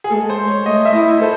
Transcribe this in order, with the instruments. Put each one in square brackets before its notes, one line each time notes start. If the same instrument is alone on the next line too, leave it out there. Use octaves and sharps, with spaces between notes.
[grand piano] G#4
[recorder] G#3 A3 [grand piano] A4
[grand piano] C5
C#5
[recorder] A3 [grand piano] D#5
[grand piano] E5
[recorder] E4 [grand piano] D#5
[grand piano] A4 [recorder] C5